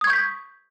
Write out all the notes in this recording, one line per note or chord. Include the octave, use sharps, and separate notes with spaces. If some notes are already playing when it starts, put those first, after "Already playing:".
C#6 D#6 G6 G#6 B6